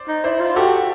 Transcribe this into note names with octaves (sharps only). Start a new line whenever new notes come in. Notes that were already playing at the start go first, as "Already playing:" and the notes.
Already playing: C5 D5
D#4
E4 C5 D5
F4
F#4 G4 A4